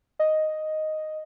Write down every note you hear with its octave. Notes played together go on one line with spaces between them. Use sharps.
D#5